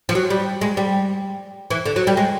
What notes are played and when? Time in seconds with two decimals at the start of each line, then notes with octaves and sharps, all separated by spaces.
0.09 F3
0.15 F#3
0.30 G3
0.61 G#3
0.77 G3
1.70 E3
1.86 D3
1.96 F#3
2.07 G3
2.17 G#3